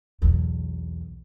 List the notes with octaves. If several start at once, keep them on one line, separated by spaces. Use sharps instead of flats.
B1 E2